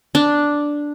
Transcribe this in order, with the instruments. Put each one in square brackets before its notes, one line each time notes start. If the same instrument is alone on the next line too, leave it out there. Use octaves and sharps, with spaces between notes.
[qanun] D4